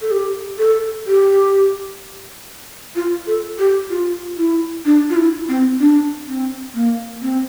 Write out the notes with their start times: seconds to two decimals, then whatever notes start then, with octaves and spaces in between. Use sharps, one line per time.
0.02 A4
0.11 G4
0.58 A4
1.06 G4
2.96 F4
3.27 A4
3.59 G4
3.90 F4
4.37 E4
4.85 D4
5.10 F4
5.16 E4
5.48 C4
5.80 D4
6.28 C4
6.74 A#3
7.22 C4